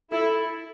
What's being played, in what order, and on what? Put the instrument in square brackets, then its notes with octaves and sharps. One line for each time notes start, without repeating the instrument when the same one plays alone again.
[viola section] E4 [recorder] A4